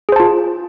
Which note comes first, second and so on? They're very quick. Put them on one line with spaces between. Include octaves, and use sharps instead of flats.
G#4 C5 A5 F4